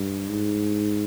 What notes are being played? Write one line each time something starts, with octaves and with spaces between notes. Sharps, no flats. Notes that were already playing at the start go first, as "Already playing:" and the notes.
Already playing: G2
G#2